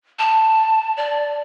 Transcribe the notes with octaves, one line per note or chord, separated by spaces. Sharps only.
A5
D5